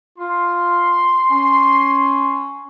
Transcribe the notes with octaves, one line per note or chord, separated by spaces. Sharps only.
F4 C6
C#4